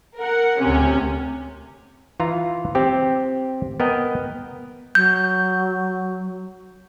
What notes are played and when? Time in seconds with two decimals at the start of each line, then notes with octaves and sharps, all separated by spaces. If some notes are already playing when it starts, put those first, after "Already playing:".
0.18 A#4 F#5
0.59 D2 C3 C#4
2.20 E3 F4 A#5
2.75 C4 G4
3.80 B3 A#4 D#5 G5
4.95 F#3 G6